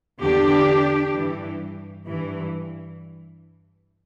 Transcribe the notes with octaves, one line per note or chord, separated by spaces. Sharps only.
E2 D3 D4 G4
G2 E3
G2 E3